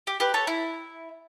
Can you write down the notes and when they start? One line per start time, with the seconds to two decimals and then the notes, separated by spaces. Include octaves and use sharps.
0.07 G4
0.20 G4 B4
0.34 A4 C#5
0.47 E4